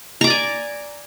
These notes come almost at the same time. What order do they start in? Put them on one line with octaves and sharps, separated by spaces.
A#5 D6 D5 G#5